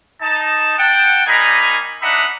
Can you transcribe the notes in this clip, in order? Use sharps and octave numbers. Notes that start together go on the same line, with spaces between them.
D#4 A5
F#5 G5 A5
G3 A#3 D#4 G#5 A#5 B5
D4 D#4 E5 F#5 B5